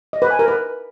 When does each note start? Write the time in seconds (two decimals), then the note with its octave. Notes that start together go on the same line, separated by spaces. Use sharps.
0.13 D#5
0.22 B4
0.31 G#5
0.39 A#4
0.48 B4